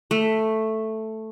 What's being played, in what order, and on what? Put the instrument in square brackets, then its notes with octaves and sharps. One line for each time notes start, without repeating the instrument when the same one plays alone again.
[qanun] A3